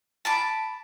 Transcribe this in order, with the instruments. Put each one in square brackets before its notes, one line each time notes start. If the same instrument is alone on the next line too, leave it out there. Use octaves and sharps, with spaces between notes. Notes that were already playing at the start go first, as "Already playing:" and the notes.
[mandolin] A5 B5 D6